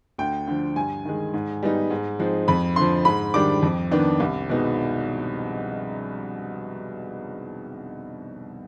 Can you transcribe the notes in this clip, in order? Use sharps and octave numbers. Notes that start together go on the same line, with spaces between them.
D2 G5
D3 F3
G2 G#5
D#3 G#3
G#2
G3 B3 D#4
G#2
F3 G#3 C4 D#4
F2 B5
D3 F3 C6
G#2 B5
D#3 G3 D4 D6
F2
D#3 B3 D4
C2
B2 G#3 B3 D#4